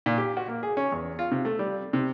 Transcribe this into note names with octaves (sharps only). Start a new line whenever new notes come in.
A#2
G4
F#4
A#3
G#4
C#4
E2
F4
C3
A3
G3
C3